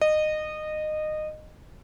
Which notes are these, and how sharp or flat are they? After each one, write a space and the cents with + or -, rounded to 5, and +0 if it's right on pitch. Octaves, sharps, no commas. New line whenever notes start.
D#5 -20